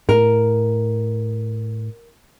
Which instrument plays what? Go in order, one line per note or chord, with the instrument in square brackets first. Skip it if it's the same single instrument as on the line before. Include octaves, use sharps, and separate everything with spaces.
[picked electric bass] A2 [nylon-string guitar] A#4